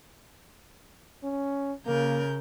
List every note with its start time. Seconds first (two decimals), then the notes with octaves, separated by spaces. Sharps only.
1.23 C#4
1.86 C#3 A#3 A#4 G6